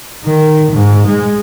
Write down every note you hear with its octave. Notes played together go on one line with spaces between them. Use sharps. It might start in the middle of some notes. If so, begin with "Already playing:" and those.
D#3
G#2
G#3